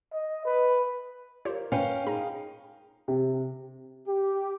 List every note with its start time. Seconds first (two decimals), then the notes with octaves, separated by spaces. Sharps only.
0.13 D#5
0.45 B4
1.45 F4 G4 A#4 C5 C#5
1.72 G2 A#2 C#4 B4 F5 G5
2.07 D#4 G#4 A#5
3.08 C3
4.07 G4